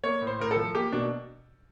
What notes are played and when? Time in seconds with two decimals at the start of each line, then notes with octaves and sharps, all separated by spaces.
0.04 A#3 C#5
0.21 A2
0.27 C5
0.39 A2 A#4
0.51 A4
0.56 F3
0.75 A#3 G4
0.92 B2 D4